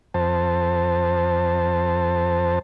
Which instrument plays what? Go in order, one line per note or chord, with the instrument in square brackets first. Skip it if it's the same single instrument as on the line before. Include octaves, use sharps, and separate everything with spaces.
[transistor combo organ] F2 C5 A5